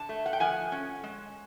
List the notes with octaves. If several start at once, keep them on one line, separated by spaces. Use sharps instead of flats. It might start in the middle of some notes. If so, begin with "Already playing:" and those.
Already playing: D3 A5
A3
F#5
G5
F3 F#5 G#5
C#4
G#3